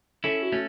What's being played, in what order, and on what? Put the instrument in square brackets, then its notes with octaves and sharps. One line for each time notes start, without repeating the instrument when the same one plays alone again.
[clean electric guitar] C#4 E4 [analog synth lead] A4
[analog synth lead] F#4
[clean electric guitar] A3 C#4